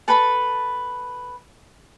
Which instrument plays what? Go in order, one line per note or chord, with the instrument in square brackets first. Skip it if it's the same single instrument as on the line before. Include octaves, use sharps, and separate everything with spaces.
[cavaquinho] A4 B4 A5 B5